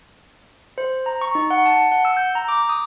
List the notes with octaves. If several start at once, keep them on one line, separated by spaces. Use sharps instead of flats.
C5
A#5
C#6
D#4
F#5
A5
F#5
E6
G6
A#5
D6
D#6